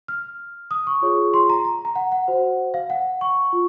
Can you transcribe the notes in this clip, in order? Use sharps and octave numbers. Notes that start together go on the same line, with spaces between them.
F6
D#6
C#6
F4 G#4 C#5
C6
A#5
A#5
A#5
F#5
F#5
F#4 C5
F5
F#5
C#6
F4